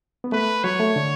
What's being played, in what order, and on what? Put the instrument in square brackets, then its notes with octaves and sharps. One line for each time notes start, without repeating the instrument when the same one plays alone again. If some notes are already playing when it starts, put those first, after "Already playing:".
[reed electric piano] B3
[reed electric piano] A3 [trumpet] B4
[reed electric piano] F#3 [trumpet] C#5
[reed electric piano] A3
D3